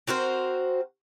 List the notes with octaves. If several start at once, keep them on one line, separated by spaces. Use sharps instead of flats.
C4 F#4 A#4 C5